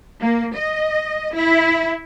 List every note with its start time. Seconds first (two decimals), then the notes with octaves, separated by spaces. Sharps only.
0.20 A#3
0.55 D#5
1.35 E4